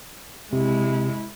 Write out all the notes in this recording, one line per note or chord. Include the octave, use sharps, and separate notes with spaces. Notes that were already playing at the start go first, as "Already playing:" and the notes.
C3 G#3 E4